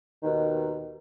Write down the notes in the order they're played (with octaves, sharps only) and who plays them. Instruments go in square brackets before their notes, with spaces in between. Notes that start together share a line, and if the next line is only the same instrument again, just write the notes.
[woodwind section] D#2 B2 D#3